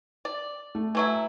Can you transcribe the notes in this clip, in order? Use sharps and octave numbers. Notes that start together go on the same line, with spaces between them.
D5
A3
E3 F#3 E4